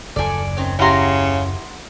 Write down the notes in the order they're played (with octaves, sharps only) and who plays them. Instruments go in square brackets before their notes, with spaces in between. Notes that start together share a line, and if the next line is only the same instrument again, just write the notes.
[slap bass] F#1 D#2 [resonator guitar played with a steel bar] F3 A4 [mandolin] D5 G#5
[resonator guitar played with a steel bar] D#3 C4 C#4
[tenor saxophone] C#3 [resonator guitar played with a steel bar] E4 G4 [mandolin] F#5 A#5 C6